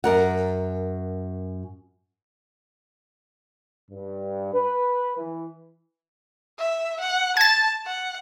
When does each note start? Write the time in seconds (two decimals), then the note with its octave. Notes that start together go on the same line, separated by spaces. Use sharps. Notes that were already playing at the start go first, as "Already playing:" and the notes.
0.04 F#2 A#4 F#5
3.91 G2
4.53 B4
5.18 E3
6.59 E5
7.00 F#5
7.37 A5 G#6 A6
7.86 F#5